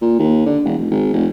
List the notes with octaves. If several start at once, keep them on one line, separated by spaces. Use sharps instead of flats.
A#2
D#2
D3
E1
F1
G#1
F1